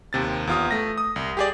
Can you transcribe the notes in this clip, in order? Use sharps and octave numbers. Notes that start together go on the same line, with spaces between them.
D#2 C3 A6
E2 F4 D#6
A3 A#6
D#6
C2
G4 G#4 D5